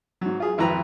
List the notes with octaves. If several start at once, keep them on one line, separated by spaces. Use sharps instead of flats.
G#2 F#3
F4 G#4
G#1 F2 E4 B4 A#5